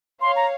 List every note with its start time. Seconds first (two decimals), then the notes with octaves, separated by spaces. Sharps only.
0.21 C#5 F5 C6
0.36 A#5